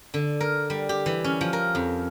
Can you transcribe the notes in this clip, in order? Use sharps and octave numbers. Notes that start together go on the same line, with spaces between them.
D3
A#4
G3
G4
E3
C#4
F3
A#4
F2